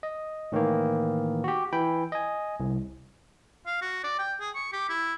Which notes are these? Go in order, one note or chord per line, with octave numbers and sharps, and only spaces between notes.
D#5
A2 D#3 E3 A#3
F#4 G4
E3 G5 B5
D#5 G#5
C2
F5
F#4
D5
G5
G#4
C#6
G4
E4